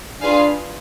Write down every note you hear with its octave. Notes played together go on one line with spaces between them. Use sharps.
D4 F4 G#4 B4 F5 G#5